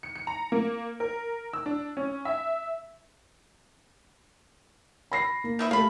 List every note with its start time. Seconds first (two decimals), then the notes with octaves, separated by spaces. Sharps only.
0.03 C#7
0.16 C#7
0.27 A#5
0.52 A#3
1.00 A#4
1.53 E6
1.66 D4
1.97 C#4
2.25 E5
5.12 B5 A#6 C7
5.44 A#3
5.59 D#3 E3 E4
5.71 A3 G4 A4 F5 B5